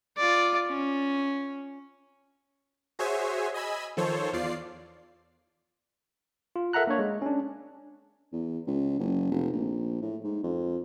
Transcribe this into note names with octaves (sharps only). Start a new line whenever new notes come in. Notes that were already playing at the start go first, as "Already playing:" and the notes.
F4 D5
C#4
F#4 G#4 C5 C#5 E5 G#5
D#5 G#5 B5 E6
D#3 F3 A4 C5 C#5
E2 F4 D5 C7
F4
A4 A#4 E5 F#5 A#5 F#6
A#3 D4 C#5
G#3
C#4 D4
E2
C#2
F#1
F1
A#1
A2
G#2
F2